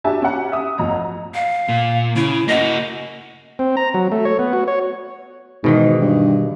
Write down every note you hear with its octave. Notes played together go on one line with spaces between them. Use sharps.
D4 F#4 G4 E5 G#5 A5
C#4 G4 F#5
E5 D#6
A1 F2 A#5
F5
A#2
C#3 E4
A#3 F#4 D#5
C4
A#5
F#3
A3
C#5
B3
F#4
C#5
G#2 B2 D#3 E3
G2